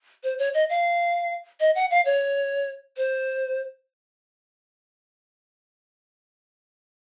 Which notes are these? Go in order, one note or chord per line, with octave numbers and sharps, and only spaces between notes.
C5
C#5
D#5
F5
D#5
F#5
F5
C#5
C5